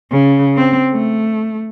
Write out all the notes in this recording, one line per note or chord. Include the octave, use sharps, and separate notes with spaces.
C#3
C4
A3